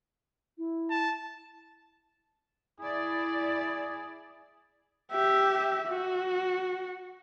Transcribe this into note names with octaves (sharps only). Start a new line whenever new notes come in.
E4
A5
E4 G#4 D5
G4 E5
F#4